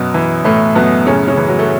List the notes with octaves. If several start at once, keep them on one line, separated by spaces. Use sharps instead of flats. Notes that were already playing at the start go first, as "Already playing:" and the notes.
Already playing: F#2 B2 B3
E3
A2 E3 A3
F#2 B2 B3
A2 C#3 C#4
C#3 C#4
E3
F#3
A3